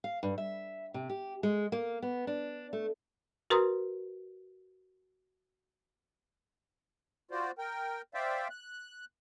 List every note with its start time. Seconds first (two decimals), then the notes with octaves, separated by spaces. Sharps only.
0.04 F5
0.23 G2
0.38 E5
0.94 C3
1.09 G4
1.43 G#3
1.72 A#3
2.02 B3
2.27 D4
2.73 A3
3.50 F#4 A#4 B4 A#5 C6 D#6
7.31 F4 F#4 C5 D5
7.58 A#4 G5
8.14 C5 D5 E5 F5 G5
8.50 F#6